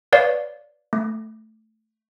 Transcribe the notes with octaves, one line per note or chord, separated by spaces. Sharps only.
B4 C#5 D5 F5
A3